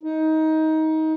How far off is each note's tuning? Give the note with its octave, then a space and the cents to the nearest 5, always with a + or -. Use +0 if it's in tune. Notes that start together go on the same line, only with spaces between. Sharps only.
D#4 +20